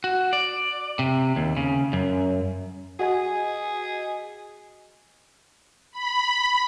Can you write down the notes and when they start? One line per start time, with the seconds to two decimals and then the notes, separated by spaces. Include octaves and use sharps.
0.04 F#4
0.33 D5
0.99 C3
1.36 D#2
1.57 C#3
1.93 F#2
2.99 F#4 G#4 D#5 G#5
5.92 B5